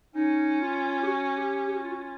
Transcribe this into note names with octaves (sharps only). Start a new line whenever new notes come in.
C#4 D#4
F4
G4
F#4
G4
G4
F#4
F4
F#4
F4